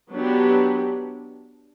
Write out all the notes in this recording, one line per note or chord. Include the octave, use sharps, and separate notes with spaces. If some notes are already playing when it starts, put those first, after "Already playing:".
F#3 B3 D4 G4